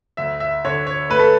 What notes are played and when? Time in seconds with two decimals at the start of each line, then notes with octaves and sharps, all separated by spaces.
0.17 D2 E5
0.40 E5
0.65 D3 C#5
0.87 C#5
1.10 A3 B4
1.19 A4